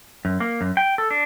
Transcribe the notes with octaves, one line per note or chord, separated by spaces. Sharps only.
F#2
A#3
F#2
G5
A4
D4